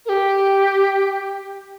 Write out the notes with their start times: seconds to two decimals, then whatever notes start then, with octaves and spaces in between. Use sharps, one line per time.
0.06 A#4
0.09 G4